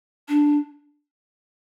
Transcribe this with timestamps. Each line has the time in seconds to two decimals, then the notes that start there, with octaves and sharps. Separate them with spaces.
0.28 D4